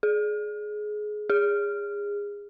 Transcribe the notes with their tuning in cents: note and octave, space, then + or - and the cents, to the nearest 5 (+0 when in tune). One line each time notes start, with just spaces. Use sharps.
G#4 +20
G#4 -25